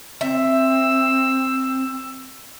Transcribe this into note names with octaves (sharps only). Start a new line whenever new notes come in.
C4 E5 E6